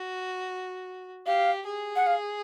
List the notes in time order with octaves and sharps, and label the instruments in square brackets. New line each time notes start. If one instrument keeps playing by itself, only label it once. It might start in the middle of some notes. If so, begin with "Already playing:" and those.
Already playing: [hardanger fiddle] F#4
[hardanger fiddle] G4 [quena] F5
[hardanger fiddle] G#4
[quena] F#5
F5